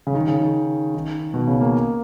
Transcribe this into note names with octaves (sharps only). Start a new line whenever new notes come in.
C#3
D#3
C#3
D#3
D#3
B2
C#3
A#3